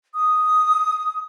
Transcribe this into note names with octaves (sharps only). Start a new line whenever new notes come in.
D#6